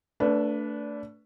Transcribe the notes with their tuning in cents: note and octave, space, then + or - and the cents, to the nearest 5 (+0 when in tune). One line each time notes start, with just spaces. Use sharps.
A3 +20 D4 -20 B4 +0